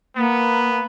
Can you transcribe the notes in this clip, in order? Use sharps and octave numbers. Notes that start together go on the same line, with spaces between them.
A#3 B3